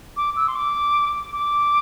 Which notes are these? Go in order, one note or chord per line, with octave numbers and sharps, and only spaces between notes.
D6
E6
C6
D6
D6